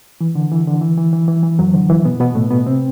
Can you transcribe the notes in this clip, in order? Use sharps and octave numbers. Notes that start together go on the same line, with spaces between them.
E3
D3
E3
D3
E3
E3
E3
E3
E3
F#2 F#3
D3
E3
B2 B3
B2 B3
A2 A3
B2 B3
C3 C4